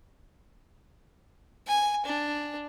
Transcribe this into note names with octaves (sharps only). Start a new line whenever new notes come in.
G#5
D4